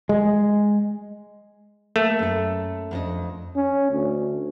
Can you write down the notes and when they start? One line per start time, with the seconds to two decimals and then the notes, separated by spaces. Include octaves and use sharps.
0.09 G#3
1.96 A3 A#3
2.19 F#2 A4
2.91 F2 D4 D#5
3.56 C#4
3.91 D2